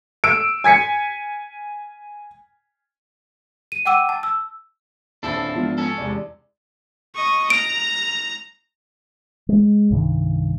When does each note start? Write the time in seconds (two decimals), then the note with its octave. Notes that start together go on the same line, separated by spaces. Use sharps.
0.24 E6 D7
0.64 G#5 G#6 B6 C#7
3.72 D#7
3.85 F#5 G5 D6 E6 D#7
4.09 A5
4.23 E6
5.23 D#1 C4 D4 E4 A4 C7
5.55 G#2 F3 B3 F4
5.78 C#4 A4
5.98 E2 C3 G#3 D5
7.15 D#5 C#6
7.50 A#5 D7
9.49 G#3
9.91 C2 G2 D#3